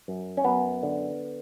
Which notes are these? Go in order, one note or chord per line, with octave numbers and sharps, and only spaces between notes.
F#2
C#4
F#2 B3
D3